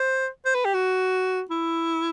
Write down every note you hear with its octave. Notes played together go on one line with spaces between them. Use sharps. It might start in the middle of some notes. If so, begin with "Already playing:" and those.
Already playing: C5
C5
B4
G4
F#4
E4